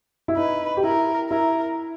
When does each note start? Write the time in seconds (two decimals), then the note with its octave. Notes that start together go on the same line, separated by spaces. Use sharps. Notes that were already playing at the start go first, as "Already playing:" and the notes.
0.28 E4
0.37 D#4 B4
0.77 G4
0.84 E4 A#4
1.30 E4 A#4